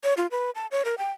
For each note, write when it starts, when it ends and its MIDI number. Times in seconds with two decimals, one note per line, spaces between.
0.04 0.14 73
0.17 0.27 65
0.31 0.50 71
0.55 0.67 81
0.71 0.82 73
0.85 0.95 70
0.98 1.11 79